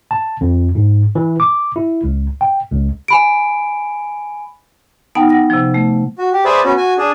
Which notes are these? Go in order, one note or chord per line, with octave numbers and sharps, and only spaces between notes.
A5
F2
G#2
E3
D6
E4
C#2
G5
C#2
G#5 B5 D7
B3 D#4 F#5 G5 A5
F#5 A#6
C3 F3
A3
F#4
G4
G#4 B4 C5 D5 E5
B3 C#4 F#4
F#4 G#5
D4 G#4